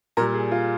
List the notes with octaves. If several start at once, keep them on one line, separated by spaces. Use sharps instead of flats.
A#2 G3 A#4
G#4
F4